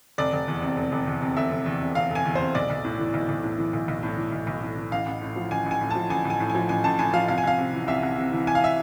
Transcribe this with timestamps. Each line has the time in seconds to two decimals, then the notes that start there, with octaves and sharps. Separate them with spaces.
0.18 F1 D5
0.33 F1
0.48 E2
0.62 C3
0.77 F1
0.92 F1
1.07 E2
1.22 C3
1.37 F1 E5
1.51 F1
1.66 E2
1.81 C3
1.95 F1 F5
2.11 F1 G#5
2.25 E2
2.35 C3 C5
2.55 B1 D5
2.70 B1
2.84 A2
2.99 E3
3.14 B1
3.29 B1
3.43 A2
3.58 E3
3.73 B1
3.88 B1
4.03 A2
4.17 E3
4.32 B1
4.47 B1
4.62 A2
4.77 E3
4.92 A1 F5
5.06 A1
5.22 A2
5.36 F3
5.51 A1 G#5
5.66 A1
5.71 G#5
5.81 A2
5.90 F3 A5
6.10 A1 G#5
6.25 A1
6.30 G#5
6.40 A2
6.50 G#5
6.55 F3
6.69 A1 G#5
6.84 A1 A5
6.99 A2 G#5
7.14 F3 F5
7.28 C2 F5
7.38 G#5
7.43 C2 F5
7.58 C3
7.73 E3
7.88 C2 E5
8.03 C2
8.17 C3
8.32 E3
8.47 C2 G#5
8.55 F5
8.64 E5